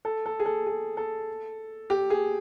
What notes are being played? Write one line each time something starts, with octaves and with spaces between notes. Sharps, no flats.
A4
A4
G#4
A4
G#4
A4
G4
G#4